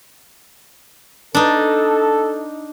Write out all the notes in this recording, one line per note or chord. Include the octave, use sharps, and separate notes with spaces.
D4 D#4 A4